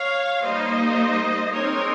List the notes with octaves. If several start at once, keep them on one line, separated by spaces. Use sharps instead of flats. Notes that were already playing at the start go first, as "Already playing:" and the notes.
Already playing: C#5 F5
G3 A#3 D#4 C5 D#5
G#3 C4 D#4 A#4 C#5